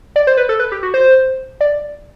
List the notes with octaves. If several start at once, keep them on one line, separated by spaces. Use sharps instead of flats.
D5
C5
B4
A4
B4
G4
F#4
C5
D5